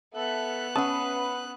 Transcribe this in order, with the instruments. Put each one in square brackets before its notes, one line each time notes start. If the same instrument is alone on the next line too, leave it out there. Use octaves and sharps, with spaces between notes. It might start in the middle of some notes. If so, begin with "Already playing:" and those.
[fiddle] B3 F#6 [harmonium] A4 E5
[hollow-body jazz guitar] C#4 E5 A5 [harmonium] B4 [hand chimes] F#5 D#6